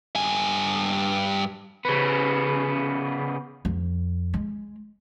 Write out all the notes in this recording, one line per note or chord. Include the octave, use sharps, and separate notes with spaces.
G2 G#5
C#3 B3
F2
G#3